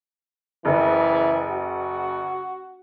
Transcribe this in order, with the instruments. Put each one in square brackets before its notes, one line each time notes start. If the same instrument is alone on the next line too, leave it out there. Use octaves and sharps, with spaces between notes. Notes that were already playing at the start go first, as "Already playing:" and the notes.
[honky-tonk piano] F#1 [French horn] E3
[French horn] F#4